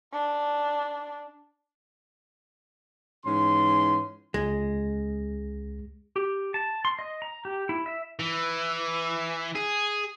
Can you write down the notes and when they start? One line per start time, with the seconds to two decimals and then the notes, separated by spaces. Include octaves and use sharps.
0.13 D4
3.26 G#2 E3 C#4 C6
4.34 C#2 G#3 A#6
6.16 G4
6.54 A5
6.85 C6
6.99 D#5
7.22 A#5
7.45 G4
7.69 E4
7.86 E5
8.19 E3
9.56 G#4